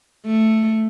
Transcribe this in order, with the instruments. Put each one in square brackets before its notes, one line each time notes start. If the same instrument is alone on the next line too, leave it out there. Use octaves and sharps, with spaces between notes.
[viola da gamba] A3